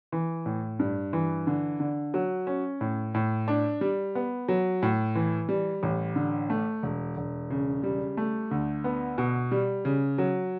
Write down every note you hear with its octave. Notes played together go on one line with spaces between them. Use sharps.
E3
A2
G2
E3
D3
D3
F#3
C#4
A2
A2
D4
G3
B3
F#3
A2
E3
G3
A1
D3
A3
E1
E1
C#3
G3
A3
D2
B3
B2
G3
C#3
F#3